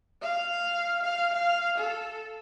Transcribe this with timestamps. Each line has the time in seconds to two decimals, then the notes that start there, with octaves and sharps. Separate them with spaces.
0.22 F5
1.03 F5
1.34 F5
1.78 A4